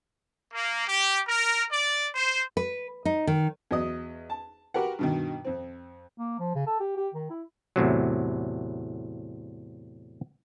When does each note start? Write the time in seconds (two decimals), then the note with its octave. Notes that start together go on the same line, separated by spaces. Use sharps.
0.52 A#3
0.87 G4
1.27 A#4
1.71 D5
2.15 C5
2.57 B4
3.05 D#4
3.27 D#3
3.71 E2 F#3 D#5 D#6
4.30 A5
4.74 F#4 G4 A#4 B4 F#5
4.99 G2 B2 D#3
5.45 F2 C4
6.18 A#3
6.39 F3
6.55 C#3
6.67 A4
6.80 G4
6.97 G4
7.15 D#3
7.30 E4
7.76 E2 A2 C3 F#3